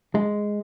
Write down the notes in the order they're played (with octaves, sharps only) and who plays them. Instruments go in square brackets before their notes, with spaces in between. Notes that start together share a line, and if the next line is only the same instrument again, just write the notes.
[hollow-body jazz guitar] G#3